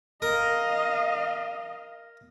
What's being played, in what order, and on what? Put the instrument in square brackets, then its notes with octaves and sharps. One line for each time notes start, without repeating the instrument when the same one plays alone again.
[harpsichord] A#4 [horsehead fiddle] D#5 F5